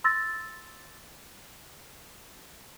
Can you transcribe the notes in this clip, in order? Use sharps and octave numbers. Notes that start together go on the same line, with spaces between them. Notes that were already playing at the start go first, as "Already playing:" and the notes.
C6 E6 A6 A#6